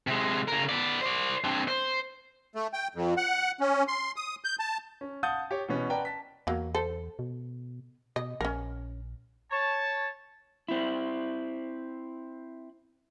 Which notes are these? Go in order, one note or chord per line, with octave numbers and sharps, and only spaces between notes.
C3 G#3
C#3 A#4
B3 D5
C5 D5
C4 D4
C5
A3
G5
F2
F#5
C#4
C6
D#6
G6
A5
C#4
F5 F#5 A5 D#6 G6 A6
G4 C#5
B2 E3 B3 C#4 F#4
B4 D5 F#5 G5 A5 A#5
A5 B6
E2 F#3 A#3
A4 C5
B2
B2 D#5
A#1 C#4 A#4
C#5 A5
C4 E4